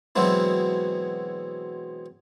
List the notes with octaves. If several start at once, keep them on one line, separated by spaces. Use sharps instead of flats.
B2 E3 F#3 G#3 C4 E4